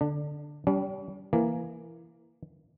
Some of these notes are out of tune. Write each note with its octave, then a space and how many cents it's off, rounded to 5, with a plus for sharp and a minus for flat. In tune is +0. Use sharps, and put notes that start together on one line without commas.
D3 +0 D4 +15
G3 -20 C#4 +45
E3 +15 A#3 +0